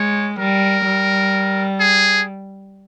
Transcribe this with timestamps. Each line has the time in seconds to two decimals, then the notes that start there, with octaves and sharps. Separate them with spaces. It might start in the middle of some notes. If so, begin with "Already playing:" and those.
Already playing: G#3 C#5
0.39 G3 A#4
0.86 G3
1.80 G#4